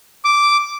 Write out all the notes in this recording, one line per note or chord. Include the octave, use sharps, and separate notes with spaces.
D6